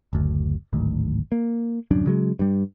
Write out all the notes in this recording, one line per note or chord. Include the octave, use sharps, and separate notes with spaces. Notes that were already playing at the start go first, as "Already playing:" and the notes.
F#1 D2
D1 G#1 D2 D#3
A#3
D1 C2 F#2 D4
C#3 F#3 G#3
G2 G3